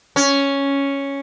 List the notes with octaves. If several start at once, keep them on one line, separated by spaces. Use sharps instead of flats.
C#4